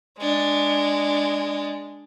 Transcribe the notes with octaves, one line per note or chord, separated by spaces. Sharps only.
G#3 D4